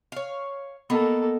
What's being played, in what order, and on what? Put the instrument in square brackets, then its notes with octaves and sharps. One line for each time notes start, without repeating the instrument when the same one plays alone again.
[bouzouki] C#5 F5
[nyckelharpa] A#3 A4 [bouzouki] B3 D#4